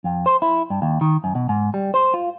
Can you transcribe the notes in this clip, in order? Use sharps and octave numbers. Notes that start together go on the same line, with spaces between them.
F2
C5
E4
G2
D#2
D#3
F#2
B2
G#2
G3
C5
F4